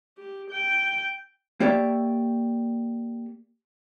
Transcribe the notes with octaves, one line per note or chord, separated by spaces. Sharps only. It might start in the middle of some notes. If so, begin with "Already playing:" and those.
G4
G5
A#3 G4 C#5 D5 E5